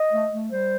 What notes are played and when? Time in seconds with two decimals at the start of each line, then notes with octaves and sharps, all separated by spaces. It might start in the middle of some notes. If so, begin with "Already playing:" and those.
Already playing: D#5
0.12 A3
0.31 A3
0.50 G3 C5